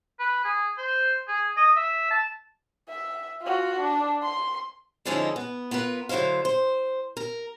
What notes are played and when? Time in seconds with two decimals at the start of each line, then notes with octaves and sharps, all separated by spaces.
0.19 B4
0.44 G#4
0.78 C5
1.28 G#4
1.57 D#5
1.76 E5
2.11 A5
2.89 E5
3.42 F4 F#4
3.80 D4
4.22 C6
5.05 D3 F3 G#3 C#4 D#4 E4
5.36 B3
5.71 B3 F4 A#4 B4
6.09 D3 F#3 E4 C5 F5
6.45 C5
7.17 A#4